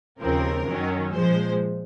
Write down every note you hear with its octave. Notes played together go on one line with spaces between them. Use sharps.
D#2 C#3 F3 C4 A#4
F#2 D#3 F#3 C#4
A#2 F3 G#3 C5